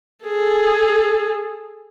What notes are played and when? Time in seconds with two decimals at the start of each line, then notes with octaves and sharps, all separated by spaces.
0.25 G#4 A4